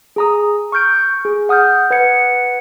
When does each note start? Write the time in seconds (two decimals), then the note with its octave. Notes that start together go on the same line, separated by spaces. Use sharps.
0.16 G#4 A#5 D#6
0.72 C#6 F6 G6 D7
1.25 G#4
1.49 F#5 D#6 F6 G6
1.91 B4 F#5 G#6 C#7